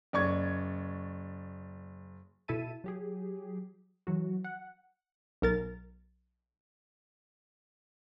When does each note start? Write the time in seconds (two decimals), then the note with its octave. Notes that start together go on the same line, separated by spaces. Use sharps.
0.13 F#1 D5 C#6 G#6
2.48 B2 E4 A4 E5 A5 D#7
2.84 F#3 G4 G#4
4.07 E3 F#3 F#4
4.44 F#5
5.42 B1 A#4 A6